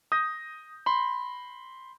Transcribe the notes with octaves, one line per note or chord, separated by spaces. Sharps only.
D#6 G6 A#6
B5 C6